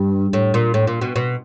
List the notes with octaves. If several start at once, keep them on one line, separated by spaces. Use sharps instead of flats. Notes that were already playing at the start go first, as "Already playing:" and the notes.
Already playing: G2
A2
A#2
A2
A#2
B2
B2